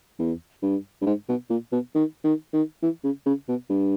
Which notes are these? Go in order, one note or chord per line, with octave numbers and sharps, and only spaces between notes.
E2
G2
G2
G#2
B2
A#2
B2
D#3
D#3
D#3
E3
C#3
C#3
B2
G2